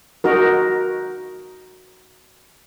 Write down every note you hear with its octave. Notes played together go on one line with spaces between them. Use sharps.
D#4 F#4 A#4